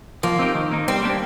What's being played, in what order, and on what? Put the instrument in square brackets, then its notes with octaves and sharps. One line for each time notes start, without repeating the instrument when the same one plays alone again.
[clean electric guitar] F3 [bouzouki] A#3
[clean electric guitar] C4 D#4 G4
D#3
A#3 D#4
[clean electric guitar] G3 [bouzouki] C4
[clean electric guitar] A#3 D4 G4